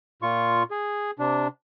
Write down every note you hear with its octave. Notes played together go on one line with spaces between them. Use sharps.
A#2 F4 C#6
G#4
C3 D4